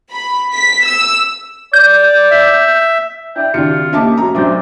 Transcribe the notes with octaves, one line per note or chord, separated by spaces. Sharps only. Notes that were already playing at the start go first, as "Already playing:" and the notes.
B5
B6
E6
D5 G6
E5
E4 D5 G5
G#1 C#3 D4 E4 F4 G4 C#7
A#3 C#4 D#4 G4 E5 A5 D6
F1 C#4 F#4 A#5
B1 F#3 C4 D4 D5 E5 G6